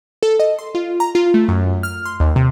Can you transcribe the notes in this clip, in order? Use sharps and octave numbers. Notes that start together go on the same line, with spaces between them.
A4
D#5
C6
F4
A#5
F4
A3
F#2
F6
C6
D#2
C3